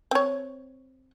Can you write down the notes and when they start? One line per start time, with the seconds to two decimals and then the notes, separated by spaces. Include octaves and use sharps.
0.11 C4 C#5